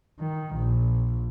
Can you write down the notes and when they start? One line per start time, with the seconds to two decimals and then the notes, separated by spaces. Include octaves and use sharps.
0.19 D#3
0.55 A#1